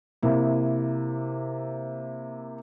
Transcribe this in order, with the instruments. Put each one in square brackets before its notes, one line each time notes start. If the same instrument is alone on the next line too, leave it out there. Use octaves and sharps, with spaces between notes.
[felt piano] C3 A#3 E4